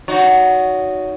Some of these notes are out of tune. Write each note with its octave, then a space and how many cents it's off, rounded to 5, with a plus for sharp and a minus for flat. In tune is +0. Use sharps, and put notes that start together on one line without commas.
D#4 +0 F#4 +0 C#5 +40